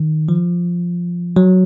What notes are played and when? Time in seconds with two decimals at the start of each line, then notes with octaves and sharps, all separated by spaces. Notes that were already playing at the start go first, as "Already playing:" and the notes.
Already playing: D#3
0.29 F3
1.36 F#3